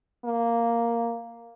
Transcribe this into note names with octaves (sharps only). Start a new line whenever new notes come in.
A#3